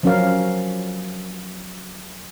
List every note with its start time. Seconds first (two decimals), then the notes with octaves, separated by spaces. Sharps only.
0.03 F3 F#3 C#4 F#4 A#4 F5